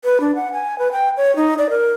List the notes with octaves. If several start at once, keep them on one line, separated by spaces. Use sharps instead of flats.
B4
D4
F#5
G#5
B4
G5
C#5
D#4
D5
A#4